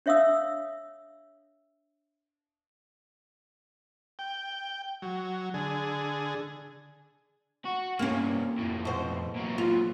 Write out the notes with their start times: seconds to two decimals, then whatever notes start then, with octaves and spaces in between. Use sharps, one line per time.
0.06 D4 C#5 E5 F5 D#6 E6
4.19 G5
5.02 F#3
5.54 D3 G#4
7.65 F#4
7.99 G2 C3 A#3 C#4
8.58 F2 A2
8.85 B2 C5
9.36 A#2 F#3
9.58 F4